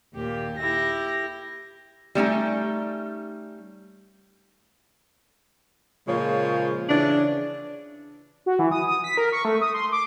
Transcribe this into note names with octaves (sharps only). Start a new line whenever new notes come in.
D#2 A#2 G4
E4 G4 A#6
G3 A3 C#4 D#4
A#2 C#3 F3 G#3 C#5
C#3 E3 D4
F#4
E3
D#6
D#6
B6
A#4
C#6
A3
D#6
C6
D6